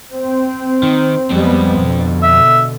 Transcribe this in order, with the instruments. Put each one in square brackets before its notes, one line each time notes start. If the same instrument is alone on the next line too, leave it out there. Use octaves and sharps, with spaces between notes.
[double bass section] C4
[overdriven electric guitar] D#3
[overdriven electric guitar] F2 C4 [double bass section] G3 G#3 B3
[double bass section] B2 D3
[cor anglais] E5